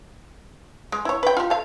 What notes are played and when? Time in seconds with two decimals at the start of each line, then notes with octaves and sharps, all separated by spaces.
0.92 G#3
1.05 E4 C#5
1.23 B4 G5
1.37 F4 G4
1.50 A4 F5